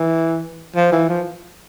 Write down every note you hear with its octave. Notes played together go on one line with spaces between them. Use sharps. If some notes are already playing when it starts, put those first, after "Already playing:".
Already playing: E3
F3
E3
F3